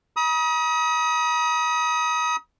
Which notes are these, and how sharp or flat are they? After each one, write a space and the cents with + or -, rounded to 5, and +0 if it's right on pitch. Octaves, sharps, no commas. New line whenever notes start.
B5 -45 D#6 +30